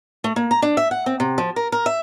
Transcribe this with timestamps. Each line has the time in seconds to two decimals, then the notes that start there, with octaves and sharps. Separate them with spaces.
0.24 A3
0.36 A#3
0.51 A#5
0.62 D4
0.77 E5
0.91 F#5
1.06 C4
1.20 C3
1.38 F3
1.56 A#4
1.72 A#4
1.86 E5